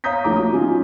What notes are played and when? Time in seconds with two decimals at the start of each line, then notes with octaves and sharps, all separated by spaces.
0.04 C#5 F5 A#5 D#6 G6 B6
0.24 A#1 A3 A#5 D6
0.36 F#4 D#6
0.53 F#3 C#4 D#4 F4